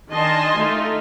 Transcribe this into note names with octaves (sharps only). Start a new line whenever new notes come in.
D#3 D4 D#5 G#5 A5 C6
A3 D#4 F4